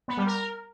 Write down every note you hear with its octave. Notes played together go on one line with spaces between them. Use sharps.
B3
G3
A#4